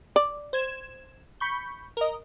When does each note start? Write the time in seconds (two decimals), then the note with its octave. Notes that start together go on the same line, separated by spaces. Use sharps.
0.16 D5
0.53 C5 G#6 E7
1.40 B5 C#6 G6
1.97 A#4 D#5